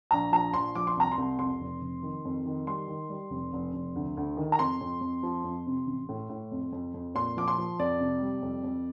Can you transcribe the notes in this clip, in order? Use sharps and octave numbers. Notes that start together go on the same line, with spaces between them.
A#1 A#5
F3 A#5
A#1 C6
F3 D6
C6
C2 A#5
C6
C2
F2 C6
F1
F1
D#3
F2
D#3
G3 C6
D#3
G3
F1
F1
F1
D2
D2
D#3
A#5
F2 C6
F2
F2
F3
F2
C3
A1
A2
A2
F2
F2
F2
A#2 C6
F3 D6
C6
F3
F2 D5
C3
G3
F2
F2